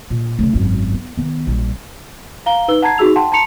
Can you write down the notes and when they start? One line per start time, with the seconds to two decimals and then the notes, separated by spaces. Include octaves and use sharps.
0.10 A#2
0.39 C#3 A3
0.53 G#1 F#2
0.94 B3
1.17 D#3 B3
1.47 A#1 G3
2.46 F5 A#5 G7
2.68 D#4 B4 E6 G7
2.82 F#5 A5 A#5 G#6 C7
2.98 D#4 F#4 G#4 E6 F7
3.16 F#5 G5 A5 C6
3.32 A5 A#5 C6 C#7 F7